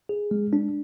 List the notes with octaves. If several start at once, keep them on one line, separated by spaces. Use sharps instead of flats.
G#4
G#3
D4